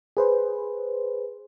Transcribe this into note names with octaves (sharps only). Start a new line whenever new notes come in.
G#4 B4 C5